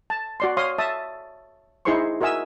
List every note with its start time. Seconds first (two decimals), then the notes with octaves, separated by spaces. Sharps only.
0.10 A5
0.40 F#4 D5 C6
0.57 C#5 F5 C6 D#6
0.78 E5 A5 D#6
1.85 D#4 E4 G#4 C5 C6 C#6
2.21 F#4 A#4 D#5 E5 G#5 E6